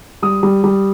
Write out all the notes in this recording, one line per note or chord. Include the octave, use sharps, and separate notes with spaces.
G3 D#6
G3
G3